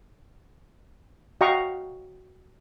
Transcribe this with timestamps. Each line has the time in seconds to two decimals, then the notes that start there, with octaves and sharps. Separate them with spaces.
1.41 F#4 D#5 F5 G5 A#5 C#6